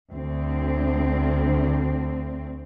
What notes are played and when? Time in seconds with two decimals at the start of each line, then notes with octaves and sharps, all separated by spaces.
0.12 D2 C4